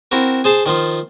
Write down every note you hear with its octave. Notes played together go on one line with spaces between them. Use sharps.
C4 E4 F#4 A#4
G#4 C5 A5
D#3 F3 F4